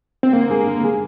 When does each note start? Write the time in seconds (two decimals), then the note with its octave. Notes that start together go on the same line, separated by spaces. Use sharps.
0.23 C4
0.33 D3 A#3
0.50 G#3 D4 G#4
0.67 D3
0.83 G#3 D4 G#4